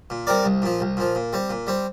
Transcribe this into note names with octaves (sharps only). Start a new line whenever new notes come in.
A#2
G3 C4 A#4 D5
C2
A#2 F3
C2
A#2 F3
A#2
G3 C4
A#2
G3 C4